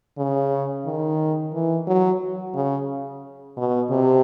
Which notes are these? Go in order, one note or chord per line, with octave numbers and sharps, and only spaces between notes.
C#3
D#3
E3
F#3
C#3
B2
C3